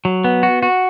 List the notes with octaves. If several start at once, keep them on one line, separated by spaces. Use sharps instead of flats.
F#3
B3
F#4
F#4